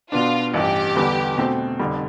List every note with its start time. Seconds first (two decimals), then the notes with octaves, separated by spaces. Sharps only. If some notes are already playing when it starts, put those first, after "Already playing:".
0.11 B2 B3 D4 F4
0.54 A1 G2 E3 G4
0.95 E2 D3 G3 B3
1.37 B2 A3 C4
1.79 F1 F2 D3 G3